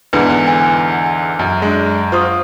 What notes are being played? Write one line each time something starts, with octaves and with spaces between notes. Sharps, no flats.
E2 G#2 D3 B4
G#5
F#2
G#3 D4
F4 C5 C#6 D#6